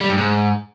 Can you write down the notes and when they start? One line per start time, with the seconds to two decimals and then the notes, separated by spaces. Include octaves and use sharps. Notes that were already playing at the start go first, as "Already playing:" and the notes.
0.01 G3
0.09 G2
0.17 G#2